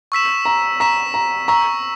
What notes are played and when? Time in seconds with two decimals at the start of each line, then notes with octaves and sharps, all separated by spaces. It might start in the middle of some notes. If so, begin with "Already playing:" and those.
0.12 C#6 E6 B6 E7
0.45 A#5
0.80 A#5 C#6 E6 B6 E7
1.14 A#5
1.48 A#5 C#6 E6 B6